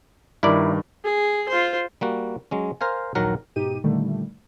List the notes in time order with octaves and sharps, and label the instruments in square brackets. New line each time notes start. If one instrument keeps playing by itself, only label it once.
[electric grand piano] G2 D#3 [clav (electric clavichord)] E4 A#4 D5
[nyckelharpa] G#4
F4 C5
[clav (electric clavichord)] G3 A#3 F#4
F#3 G#3 C#4
A#4 C5 F5 G#5
A#1 D#2 D#3 F#3 A#4 F#5
[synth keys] G#2 B2 D#4 G4 D#7
A#2 D3 D#3 G3 A3